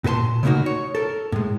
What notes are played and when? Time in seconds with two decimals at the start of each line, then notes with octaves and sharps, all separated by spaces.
0.04 A#2 F#4 B4 A5 C6
0.43 C#3 G3 A3 A#3 D#4 F#4
0.66 C#5
0.95 A4 A#4
1.32 A2 G#3